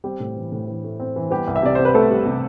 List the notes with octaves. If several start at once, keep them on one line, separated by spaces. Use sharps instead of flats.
G3 C4 G4
A2
E3
A2
E3
A3
C4
E3
G3 B3 G4
C2
E5
C3 D5
C3 C5
B4
A3 B3 A4
G3
C3